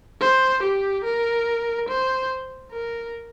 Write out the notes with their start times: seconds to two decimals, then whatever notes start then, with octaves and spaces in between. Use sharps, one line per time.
0.21 C5
0.63 G4
1.04 A#4
1.89 C5
2.71 A#4